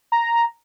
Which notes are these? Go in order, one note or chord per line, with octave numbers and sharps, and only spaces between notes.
A#5